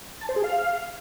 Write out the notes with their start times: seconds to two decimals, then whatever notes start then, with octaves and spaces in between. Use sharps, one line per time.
0.21 A5
0.29 C5
0.36 G#4
0.44 F5